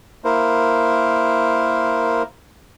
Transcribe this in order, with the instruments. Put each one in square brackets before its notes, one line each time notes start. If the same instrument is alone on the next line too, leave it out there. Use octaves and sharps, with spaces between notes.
[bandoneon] A#3 E4 A#4 C5